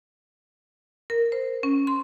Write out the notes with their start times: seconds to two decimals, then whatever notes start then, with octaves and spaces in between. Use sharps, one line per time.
1.10 A#4
1.32 C5
1.63 C#4
1.87 C6